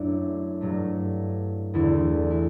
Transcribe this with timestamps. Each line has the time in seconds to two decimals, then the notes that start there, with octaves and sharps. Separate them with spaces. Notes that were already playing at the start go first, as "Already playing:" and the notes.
Already playing: F#2 F#3 A3 D4 E4
0.61 G2 F#3 A3
1.74 E2 D3 A3 E4
2.30 E4